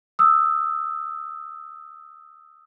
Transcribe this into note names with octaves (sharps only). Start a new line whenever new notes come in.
D#6 E6